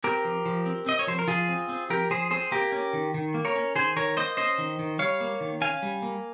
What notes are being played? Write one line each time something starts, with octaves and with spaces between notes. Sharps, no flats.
C4 G4 A#4
F3
F3
C4
C4 D#5
C#5
F3 C5
A#4
F3 F4 G#4
C4
C4
F3 G4 A#4
F3 G#4 C5
C4 G#4 C5
A#3 G4 A#4
C#4
D#3
D#3
A#3
A#4 C#5
C#4
D#3 G#4 C5
D#3 A#4 C#5
A#3 C5 D#5
C#4 C5 D#5
D#3
D#3
G3 C#5 F5
A#3
D#3
C#4 F5 G#5
G3
A#3